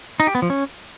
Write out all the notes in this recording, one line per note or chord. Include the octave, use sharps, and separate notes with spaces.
D#4
G4
B3
F3
C#4